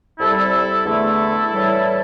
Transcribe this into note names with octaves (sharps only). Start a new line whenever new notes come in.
C2 C3 G3 E4 A4
E2 D3 A3 E4 A4
A2 E3 G3